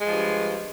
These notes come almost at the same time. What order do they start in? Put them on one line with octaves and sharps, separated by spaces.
G#3 F3 G2